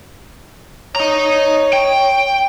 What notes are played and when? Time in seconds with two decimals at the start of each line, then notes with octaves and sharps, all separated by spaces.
0.96 C#5 D#5 A#5
1.73 G5